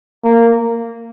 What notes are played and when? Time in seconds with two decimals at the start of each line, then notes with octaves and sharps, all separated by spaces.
0.24 A#3